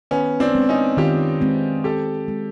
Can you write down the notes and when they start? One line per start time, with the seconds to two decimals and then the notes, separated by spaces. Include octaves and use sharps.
0.11 D#3 B3 C#4
0.40 C4 D4
0.54 G#3 C4
0.69 C#4 D#4
0.97 D#3 F4 G4
1.41 G#3 C4
1.84 D#3 G4 A4
2.28 G#3 C4